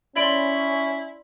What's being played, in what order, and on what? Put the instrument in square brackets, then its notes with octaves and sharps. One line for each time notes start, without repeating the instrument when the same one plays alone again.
[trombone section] C#4 [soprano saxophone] E4 [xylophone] D5 C6 [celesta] B5 D7 F#7